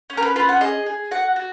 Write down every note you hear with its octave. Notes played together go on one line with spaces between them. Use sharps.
C#4
A#4
B4
F4 B4
F#5
G#4 D#5
G#4
F#4 F#5
F#4